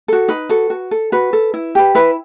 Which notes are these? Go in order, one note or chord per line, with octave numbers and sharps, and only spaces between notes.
F#4 A4
D#4 B4
F#4 A4
F#4
A4
F#4 B4
A4
E4
G4 B4
E4 B4